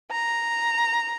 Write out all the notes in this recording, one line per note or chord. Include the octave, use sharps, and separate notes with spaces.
A#5